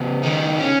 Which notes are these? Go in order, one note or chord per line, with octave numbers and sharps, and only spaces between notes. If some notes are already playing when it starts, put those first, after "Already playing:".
Already playing: C#3 B3
D#3 D#4
C#4